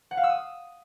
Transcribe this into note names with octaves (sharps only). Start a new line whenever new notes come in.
F#5
F5
E6
D#6